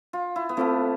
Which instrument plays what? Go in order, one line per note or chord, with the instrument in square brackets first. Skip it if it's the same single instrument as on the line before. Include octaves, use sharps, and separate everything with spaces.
[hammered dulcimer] F4
E4
B3
[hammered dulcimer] A3 [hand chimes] C4 F4 C5 F5 A5